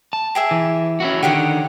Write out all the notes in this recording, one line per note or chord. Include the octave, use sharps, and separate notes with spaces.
A5
G4 G#4 E5
E3
C#4 E4 F#4
D3 D#3 G4 C#5 F#5